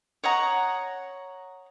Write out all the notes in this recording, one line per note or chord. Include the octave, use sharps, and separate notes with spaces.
C#5 D#5 F#5 A#5